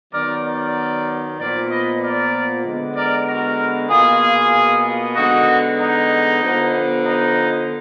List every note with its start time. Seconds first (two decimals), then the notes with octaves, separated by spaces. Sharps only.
0.13 D#3 F#3 B3 A#4 D5
0.44 A#4 D5
1.38 A#2 F3 B3 A#4 D5
1.70 B4 D#5
2.01 A#4 D5
2.64 D3 G#3 B3
2.95 A#4 D5
3.27 F#4 A#4
3.89 B2 A#3 F4 G#4
5.15 D3 G#3 B3 D#4 F#4
5.79 D#4
6.41 D3 F3 B3
7.04 D#4